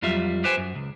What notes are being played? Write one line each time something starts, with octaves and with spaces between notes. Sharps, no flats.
F2 F#3 G3 F4 E5
G4 B4 C5 G5 G#5
F#2
C#2